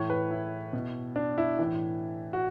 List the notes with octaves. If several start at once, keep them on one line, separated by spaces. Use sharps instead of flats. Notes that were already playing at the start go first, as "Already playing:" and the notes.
Already playing: A2 E3 C#5
B4
E4
B2
D4
E4
A2 E3
F#4